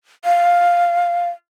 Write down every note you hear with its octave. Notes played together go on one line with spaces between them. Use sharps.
F5